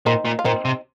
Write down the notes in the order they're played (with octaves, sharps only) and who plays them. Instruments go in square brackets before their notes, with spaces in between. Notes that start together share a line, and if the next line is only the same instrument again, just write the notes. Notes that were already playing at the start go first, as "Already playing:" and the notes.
[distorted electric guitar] A#2 [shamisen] C4 D#4
[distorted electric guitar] A#2
[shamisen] F4
[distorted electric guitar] A#2 [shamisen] C4 D#4
[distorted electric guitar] C3